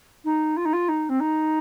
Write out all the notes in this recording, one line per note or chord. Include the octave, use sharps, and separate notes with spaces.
D#4
F4
D#4
F4
D#4
C4
D#4